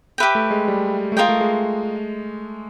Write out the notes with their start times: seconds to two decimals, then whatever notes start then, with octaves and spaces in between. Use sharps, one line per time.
0.18 G4 B4 E5 G5
0.35 A3
0.51 G#3
0.68 G3
1.12 A3
1.17 G#3 F4 A#4 D#5 G5
1.29 A3
1.41 G#3